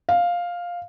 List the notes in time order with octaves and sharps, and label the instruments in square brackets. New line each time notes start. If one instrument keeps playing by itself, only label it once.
[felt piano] F5